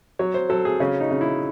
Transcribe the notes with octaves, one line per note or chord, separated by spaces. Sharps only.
F#3 C#5
C5
F#3 A4
G#4
C#3 C#4
D#4
C#3
E4